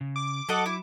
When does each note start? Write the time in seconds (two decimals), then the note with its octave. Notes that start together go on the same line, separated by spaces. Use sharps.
0.01 C#3
0.16 D6
0.49 F#3 A4 D#5 F#5
0.66 E4